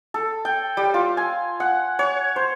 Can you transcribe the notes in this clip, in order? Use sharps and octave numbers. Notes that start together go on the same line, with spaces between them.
A4
G5
G3
F4
G#5
F#5
C#5
C5